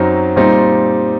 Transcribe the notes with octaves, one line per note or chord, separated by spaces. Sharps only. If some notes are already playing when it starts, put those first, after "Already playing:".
Already playing: F#2 F#3 C4 D#4
A#2 G3 C4 D#4